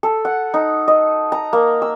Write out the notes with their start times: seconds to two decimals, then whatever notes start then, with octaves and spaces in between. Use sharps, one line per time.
0.03 A4
0.25 F#5
0.54 D#4
0.88 D#5
1.32 A#5
1.53 A#3
1.82 E6